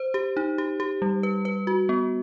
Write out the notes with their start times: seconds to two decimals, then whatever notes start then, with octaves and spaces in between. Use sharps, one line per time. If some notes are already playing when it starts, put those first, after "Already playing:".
Already playing: C5
0.14 G4
0.37 D#4
0.58 G4
0.80 G4
1.02 G3
1.23 B4
1.45 B4
1.67 F#4
1.89 B3